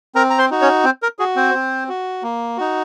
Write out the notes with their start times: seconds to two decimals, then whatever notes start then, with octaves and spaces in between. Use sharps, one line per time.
0.15 C4 A#4 A#5
0.30 A#5
0.38 C5 C6
0.50 D#4 F#4
0.61 C#4 C#5
0.84 C4 C5
1.03 A#4
1.19 F#4 G#4
1.36 C4 C5
1.55 C4
1.89 F#4
2.23 A#3
2.57 D#4 F#4